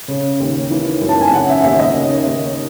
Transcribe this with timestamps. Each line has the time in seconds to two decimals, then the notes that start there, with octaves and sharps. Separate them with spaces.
0.08 C#3
0.40 D#2
0.70 E3
1.01 F#2
1.09 A5
1.21 G#5
1.32 C#3 F#5
1.49 E5
1.63 D#2 E5
1.79 D#5
1.95 C#3
2.25 D#2